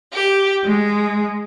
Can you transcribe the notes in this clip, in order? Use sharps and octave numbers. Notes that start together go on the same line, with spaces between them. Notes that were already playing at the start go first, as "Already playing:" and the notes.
G4
G#3